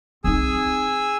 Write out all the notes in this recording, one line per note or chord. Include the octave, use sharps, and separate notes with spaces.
C4 D#4 G#4 G#5 E6